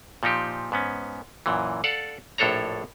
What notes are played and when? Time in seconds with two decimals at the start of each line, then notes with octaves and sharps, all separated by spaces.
0.23 A#2 F3 D#4 G4
0.72 G#2 B3 C#4
1.46 F#2 A#2 E3
1.84 A4 D5 F5 F#5
2.38 A#1 A2 D4 A4 C#5 A#5